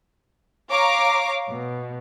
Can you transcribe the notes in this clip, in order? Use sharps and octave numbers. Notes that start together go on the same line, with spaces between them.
C#5 F5 A#5 D6
B2